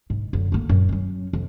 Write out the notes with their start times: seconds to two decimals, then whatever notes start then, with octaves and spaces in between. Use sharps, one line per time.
0.10 G#2
0.33 F#2 D3
0.52 D3 A#3
0.69 F#2 A#2
0.89 F#3 C#4
1.33 F2